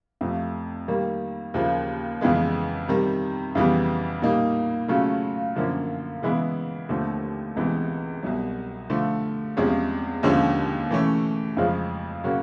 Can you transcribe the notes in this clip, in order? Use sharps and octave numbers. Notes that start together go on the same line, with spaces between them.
F2 C3 F3 A3
D#3 G3 A#3
D#2 C#3 F3 A#3
F2 C#3 E3 G#3 B3
C3 D#3 G3
F2 C#3 E3 G3 B3
A#2 G3 A#3 D#4
C#3 F#3 A3 C#4 F4
F#2 D3 F3 A#3 C#4
C#3 E3 G#3 B3 E4
D#2 D3 F3 A3 C4
C#2 C3 E3 G#3 B3
C2 B2 F#3
D3 F3 A3
E2 C3 F3 G#3 C#4
D#2 D3 F3 G#3 C#4
E3 A3 C#4
F2 C#3 F3 G#3 C#4
C#3 F#3 A#3 C#4 F#4